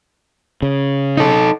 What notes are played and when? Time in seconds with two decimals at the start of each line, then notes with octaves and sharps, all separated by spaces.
0.62 C#3
1.17 D#4 A4